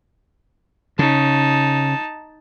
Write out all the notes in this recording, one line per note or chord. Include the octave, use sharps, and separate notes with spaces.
C#3 D#4 A5